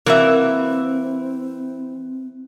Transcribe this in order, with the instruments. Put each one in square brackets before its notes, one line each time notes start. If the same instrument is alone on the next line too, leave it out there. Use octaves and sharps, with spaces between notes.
[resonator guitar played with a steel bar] E3 E5 [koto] A#3 F#4 [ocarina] C4